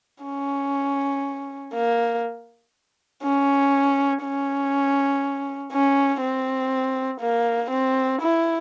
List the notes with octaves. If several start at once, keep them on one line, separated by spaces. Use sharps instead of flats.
C#4
A#3
C#4
C#4
C#4
C4
A#3
C4
E4